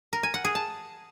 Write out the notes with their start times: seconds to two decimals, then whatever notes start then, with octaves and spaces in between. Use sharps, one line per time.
0.13 A#4
0.23 G#5
0.34 F#5
0.45 G#4
0.55 A5